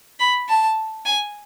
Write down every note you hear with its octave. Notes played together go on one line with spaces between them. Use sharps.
B5
A5
G#5